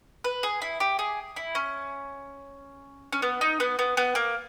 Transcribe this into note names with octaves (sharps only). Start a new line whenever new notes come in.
B4
G#4
E4
G4
G#4
E4
C#4
C#4
B3
D#4
B3
B3
B3
A#3